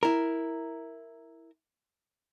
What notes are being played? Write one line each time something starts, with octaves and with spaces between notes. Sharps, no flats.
E4 A#4